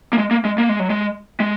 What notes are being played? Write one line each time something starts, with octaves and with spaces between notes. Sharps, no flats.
A#3
G#3
A#3
G#3
A#3
G#3
F#3
G#3
G#3